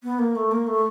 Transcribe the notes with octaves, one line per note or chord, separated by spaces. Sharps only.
B3
A#3
A3
A#3
A3